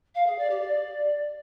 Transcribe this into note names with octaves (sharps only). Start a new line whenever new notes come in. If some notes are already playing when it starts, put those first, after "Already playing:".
F5
G#4
D5
G4
D5